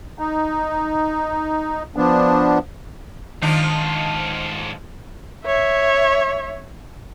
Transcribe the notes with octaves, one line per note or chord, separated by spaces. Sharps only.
D#4
F3 B3 D4
G#2 D#3 F3 D4 D#4 F4
C#5 E5